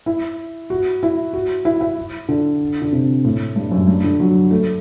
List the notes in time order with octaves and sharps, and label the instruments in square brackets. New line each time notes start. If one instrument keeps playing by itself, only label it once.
[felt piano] E4
F#4
E4
F#4
E4
E4
D3
D3
C3
A2
G2
F#2
G2
D3
F#3
A3